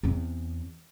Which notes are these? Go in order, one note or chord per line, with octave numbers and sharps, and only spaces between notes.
E2 C4